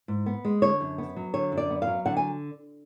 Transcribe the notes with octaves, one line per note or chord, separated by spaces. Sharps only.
G#2
B3
G#3
D3 C#5
F#2
B3
F#3
D3 C#5
F#2
D5
B3
F5
F#3
D3 F#5
G#5